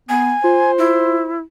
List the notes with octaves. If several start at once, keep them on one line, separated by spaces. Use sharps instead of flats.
B3 G#5
F4 C5
E4